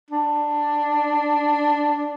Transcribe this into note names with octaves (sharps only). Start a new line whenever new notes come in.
D4